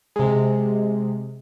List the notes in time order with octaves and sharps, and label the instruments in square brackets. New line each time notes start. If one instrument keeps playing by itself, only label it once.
[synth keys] C3 G#3